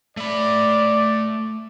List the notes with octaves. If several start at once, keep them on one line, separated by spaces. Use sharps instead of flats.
A3 D5 B5